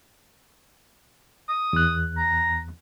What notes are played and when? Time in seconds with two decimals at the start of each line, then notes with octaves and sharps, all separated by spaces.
1.49 D#6
1.73 E2 F#6
2.17 A#5